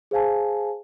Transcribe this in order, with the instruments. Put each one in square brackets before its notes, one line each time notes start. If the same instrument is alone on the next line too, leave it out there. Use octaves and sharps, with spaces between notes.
[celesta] G#4 C5 F5 G#5 A5